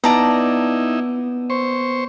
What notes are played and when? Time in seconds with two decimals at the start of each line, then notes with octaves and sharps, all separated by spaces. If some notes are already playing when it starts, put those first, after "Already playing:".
0.04 B3 D#4 E4 D5 A5 A#5
1.50 C5 C#6